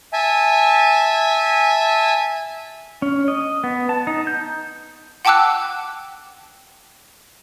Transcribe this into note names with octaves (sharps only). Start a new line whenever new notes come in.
E5 G#5 A5
C#4
D#5
B3
A5
D#4
G6
F#5 G5 A5 D6 E6 F#6